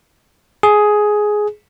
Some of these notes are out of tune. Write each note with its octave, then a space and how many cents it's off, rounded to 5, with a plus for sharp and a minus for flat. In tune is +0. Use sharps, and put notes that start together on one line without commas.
G#4 +10